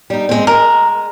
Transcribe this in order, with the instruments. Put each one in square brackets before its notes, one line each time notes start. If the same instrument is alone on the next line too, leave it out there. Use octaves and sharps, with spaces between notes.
[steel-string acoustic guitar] G3 D#4
G#3 C4
[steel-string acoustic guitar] G#3 [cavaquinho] A#4